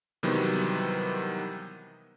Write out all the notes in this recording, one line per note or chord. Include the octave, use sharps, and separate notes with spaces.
C3 D#3 E3 F#3 G3 B3